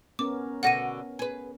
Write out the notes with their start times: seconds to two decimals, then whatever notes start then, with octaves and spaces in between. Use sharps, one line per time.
0.19 B3 C#4 A#4 D6
0.63 B2 D3 F#4 F#5 A#6 D#7
1.19 G#4 B4